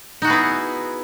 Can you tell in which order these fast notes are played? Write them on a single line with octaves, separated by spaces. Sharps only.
D#4 F#4 G#4 B3 E4